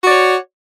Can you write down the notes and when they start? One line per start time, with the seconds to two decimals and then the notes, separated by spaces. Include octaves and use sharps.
0.01 F#4
0.06 D5
0.11 C#5